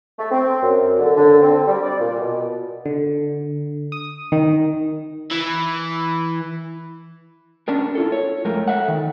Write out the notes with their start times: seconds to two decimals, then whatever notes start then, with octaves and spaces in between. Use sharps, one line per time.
0.18 A3
0.31 C4
0.62 F#2
0.99 D3
1.16 D3
1.41 C4
1.67 G3
1.83 D5
1.99 A#2
2.20 B2
2.86 D3
3.92 D#6
4.32 D#3
5.31 E3
7.68 C#4 D4 A#4
7.95 E4 F4 A4
8.12 C#5
8.45 F2 G#3 A3 A#4
8.68 A4 E5 F#5
8.88 D#3